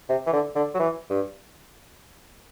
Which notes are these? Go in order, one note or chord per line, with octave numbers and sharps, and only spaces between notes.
C3
E3
D3
D3
F#3
E3
G2